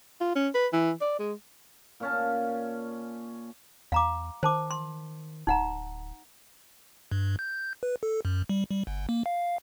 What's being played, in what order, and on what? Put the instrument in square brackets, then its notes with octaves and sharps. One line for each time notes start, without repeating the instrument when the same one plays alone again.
[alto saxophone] F4
C#4
B4
E3
D5
G#3
[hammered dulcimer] A#2 C#4 A5
[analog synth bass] E2 [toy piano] F5 A#5 D6
[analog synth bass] D#3 [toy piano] C5 A5 D6
[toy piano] C6
[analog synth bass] D1 [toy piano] D#4 F#5 A#5
[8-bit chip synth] G2
G6
B4
A4
F#2
G3
G3
G1
A#3
F5